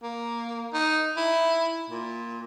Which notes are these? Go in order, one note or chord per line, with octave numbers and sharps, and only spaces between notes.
A#3
D#4
E4
A#2